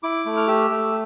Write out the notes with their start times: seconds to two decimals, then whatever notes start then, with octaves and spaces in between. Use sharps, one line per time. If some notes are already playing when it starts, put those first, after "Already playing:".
0.03 E4 D6
0.26 A3
0.37 F6
0.48 G4 E6
0.71 A3